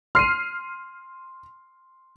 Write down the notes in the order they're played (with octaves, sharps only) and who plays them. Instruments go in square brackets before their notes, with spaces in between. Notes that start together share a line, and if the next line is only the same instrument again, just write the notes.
[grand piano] C6 D#7 [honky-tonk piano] F6 C7